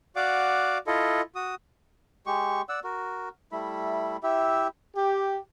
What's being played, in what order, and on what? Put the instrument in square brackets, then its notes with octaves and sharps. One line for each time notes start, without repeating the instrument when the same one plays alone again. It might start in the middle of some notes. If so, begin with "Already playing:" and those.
[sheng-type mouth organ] F#4 D5 F5 F#5 D6
E4 F4 A4 D#5
F#4 D#6
[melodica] G#3 G4 C#6
D5 F#5 E6
F#4 A#4
G3 A3 E4 B5
E4 G4 E5
[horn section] G4